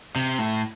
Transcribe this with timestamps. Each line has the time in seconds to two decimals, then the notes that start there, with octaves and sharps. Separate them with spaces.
0.16 C3
0.38 A2